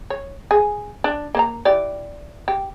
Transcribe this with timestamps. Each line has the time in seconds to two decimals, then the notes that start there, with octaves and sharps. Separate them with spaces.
0.10 C#5
0.51 G#4
1.04 D4
1.35 A#3 C5 A#5
1.65 E3 G4 D5
2.48 G4